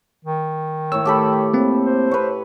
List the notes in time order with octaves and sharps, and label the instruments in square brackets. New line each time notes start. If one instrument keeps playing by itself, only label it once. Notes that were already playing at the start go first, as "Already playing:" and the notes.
[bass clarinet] D#3
[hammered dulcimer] A2 C#5 [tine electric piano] E6
[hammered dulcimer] G4 A4 B5
[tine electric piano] A#3 C4
[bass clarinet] C5
[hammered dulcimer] B4 C#5